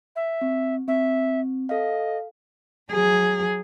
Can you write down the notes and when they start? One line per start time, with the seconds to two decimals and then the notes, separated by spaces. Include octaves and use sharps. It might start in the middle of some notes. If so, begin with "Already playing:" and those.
0.16 E5
0.41 C4
0.88 C4 E5
1.69 A4 D#5 F5
2.91 F#3 G#4